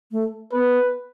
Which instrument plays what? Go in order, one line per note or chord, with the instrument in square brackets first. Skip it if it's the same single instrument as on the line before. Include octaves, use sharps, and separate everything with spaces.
[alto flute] A3
[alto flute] B3 [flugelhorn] B4